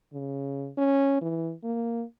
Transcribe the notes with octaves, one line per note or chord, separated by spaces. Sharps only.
C#3
C#4
E3
A#3